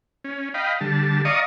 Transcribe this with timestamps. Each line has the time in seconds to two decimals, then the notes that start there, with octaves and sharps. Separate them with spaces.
0.24 C#4
0.54 D#5 F5 G5 B5
0.81 D3 G3 A5
1.25 D5 D#5 F5 A#5 C#6 D#6